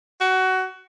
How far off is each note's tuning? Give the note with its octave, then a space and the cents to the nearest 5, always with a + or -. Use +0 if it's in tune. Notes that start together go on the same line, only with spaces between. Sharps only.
F#4 +20